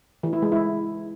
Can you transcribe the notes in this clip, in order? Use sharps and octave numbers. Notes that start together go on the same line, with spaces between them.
E3
E4
G#3
E4